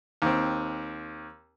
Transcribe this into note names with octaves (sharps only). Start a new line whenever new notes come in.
D#2 C4